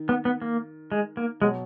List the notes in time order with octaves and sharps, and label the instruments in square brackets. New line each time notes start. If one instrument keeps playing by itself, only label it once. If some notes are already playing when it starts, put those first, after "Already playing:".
Already playing: [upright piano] D#3
[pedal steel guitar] B3
B3
A#3
G#3
A#3
[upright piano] B2 F#3 [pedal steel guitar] G#3